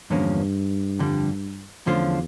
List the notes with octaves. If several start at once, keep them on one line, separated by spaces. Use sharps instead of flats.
E2 G2 D3 F3 A#3 C#4
F2 D3 G3
E2 D3 F3 A3 C#4 F4